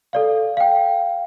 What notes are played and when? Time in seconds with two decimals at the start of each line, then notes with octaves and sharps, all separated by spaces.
0.13 A4 D5 F5
0.57 F5 G5